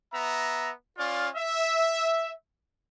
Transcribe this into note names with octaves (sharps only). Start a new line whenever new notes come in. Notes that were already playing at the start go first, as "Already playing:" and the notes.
B3 E5 A#5
C#4 F4 D5 F5
E5